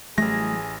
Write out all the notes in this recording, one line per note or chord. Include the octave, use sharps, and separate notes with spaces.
A1 E3 F#3 G3 A3 G#4 A#6